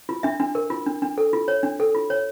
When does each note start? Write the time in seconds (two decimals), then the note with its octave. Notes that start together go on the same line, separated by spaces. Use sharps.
0.09 F4
0.23 D4 E5
0.40 D4
0.55 A#4
0.70 F4
0.87 D4
1.02 D4
1.18 A4
1.33 F4
1.48 C#5
1.63 D4
1.80 A4
1.95 F4
2.10 C#5